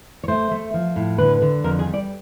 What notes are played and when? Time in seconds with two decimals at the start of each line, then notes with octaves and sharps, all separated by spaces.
0.24 C#5
0.28 A3 C5
0.51 A3
0.74 F3
0.96 A2
1.18 D3 B4
1.42 D3
1.64 F2 A#4
1.79 G#4
1.87 G3
1.94 D5